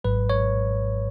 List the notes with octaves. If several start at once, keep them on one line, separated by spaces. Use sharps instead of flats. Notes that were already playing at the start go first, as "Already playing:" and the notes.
G#1 G#2 F#3 B4
C#5